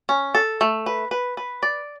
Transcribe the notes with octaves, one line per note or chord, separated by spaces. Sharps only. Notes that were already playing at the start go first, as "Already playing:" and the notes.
C#4
A4
A3
B4
B4
B4
D5